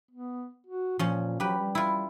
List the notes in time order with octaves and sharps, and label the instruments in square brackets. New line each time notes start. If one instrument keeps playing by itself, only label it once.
[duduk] B3
F#4
[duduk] A#2 [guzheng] F3 C#4
[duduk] F#3 [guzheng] G4 B4
[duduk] G3
[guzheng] E4 F4